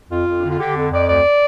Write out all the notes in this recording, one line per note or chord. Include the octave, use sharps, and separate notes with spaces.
F2 F4
F2
D4
D3
F4
D3 G4
F2
F2 D5
D2 D5